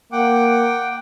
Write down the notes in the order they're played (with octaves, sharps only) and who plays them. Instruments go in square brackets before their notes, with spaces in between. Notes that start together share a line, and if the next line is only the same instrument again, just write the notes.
[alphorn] A#3 [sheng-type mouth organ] F#5 G5 D6